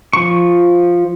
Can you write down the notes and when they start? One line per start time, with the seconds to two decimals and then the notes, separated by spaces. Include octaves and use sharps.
0.13 F3 C#6